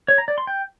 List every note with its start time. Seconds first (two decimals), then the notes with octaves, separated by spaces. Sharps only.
0.08 C#5
0.18 A#5
0.28 D5
0.38 C6
0.47 G5